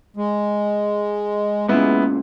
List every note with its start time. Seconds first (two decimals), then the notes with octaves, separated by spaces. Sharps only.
0.16 G#3
1.68 C#2 A#2 C#3 G#3 B3 E4